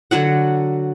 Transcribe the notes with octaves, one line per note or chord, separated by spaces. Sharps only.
D3 F#3 F#4 F#5